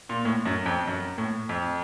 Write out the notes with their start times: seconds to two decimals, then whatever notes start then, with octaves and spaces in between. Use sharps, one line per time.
0.09 A#2
0.25 A2
0.45 F#2
0.66 F2
0.87 F#2
1.18 A2
1.49 F2